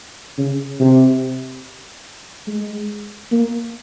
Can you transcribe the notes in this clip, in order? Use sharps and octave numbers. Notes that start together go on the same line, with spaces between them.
C#3
C3
G#3
A#3